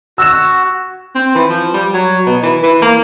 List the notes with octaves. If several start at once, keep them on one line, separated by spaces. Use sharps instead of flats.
F#4 E6 E7
C4
E3
F3
G3
F#3
B2
E3
E3
A#3